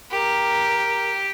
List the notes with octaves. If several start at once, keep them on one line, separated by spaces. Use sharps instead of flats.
G4 A#4